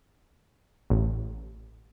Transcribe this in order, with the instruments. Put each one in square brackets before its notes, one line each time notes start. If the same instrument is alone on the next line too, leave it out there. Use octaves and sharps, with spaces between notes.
[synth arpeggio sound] A1